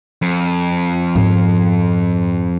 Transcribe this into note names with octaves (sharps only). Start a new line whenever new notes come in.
F2
G#2 F3